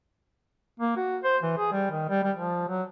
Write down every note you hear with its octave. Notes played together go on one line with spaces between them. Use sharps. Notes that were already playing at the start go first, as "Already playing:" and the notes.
A#3
F#4
C5
E3
G#4
G3
D#3
G3
G3
F3
F#3